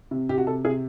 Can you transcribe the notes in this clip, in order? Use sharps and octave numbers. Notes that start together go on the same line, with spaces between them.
C3
C3 G4
F#4
C3 A4
C3 G#4